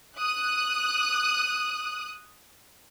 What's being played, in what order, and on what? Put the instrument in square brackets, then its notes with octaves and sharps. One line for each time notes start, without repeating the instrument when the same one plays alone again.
[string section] D#6 F#6